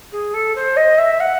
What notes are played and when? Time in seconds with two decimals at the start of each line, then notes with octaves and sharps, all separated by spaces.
0.12 G#4
0.33 A4
0.55 C5
0.76 D#5
0.98 E5
1.20 F#5